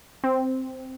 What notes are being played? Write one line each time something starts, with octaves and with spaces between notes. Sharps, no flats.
C4